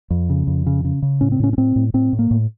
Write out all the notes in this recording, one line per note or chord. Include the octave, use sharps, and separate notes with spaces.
F2
C#3
F2
C#3
C#3
C#3
A2 C#4
C4
A2 C#4
C#4
A2 C4
A2
A2 C4
A2
A#3
A2